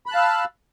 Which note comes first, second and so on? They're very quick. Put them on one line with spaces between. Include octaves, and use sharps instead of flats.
B5 F#6 A5 F5 E6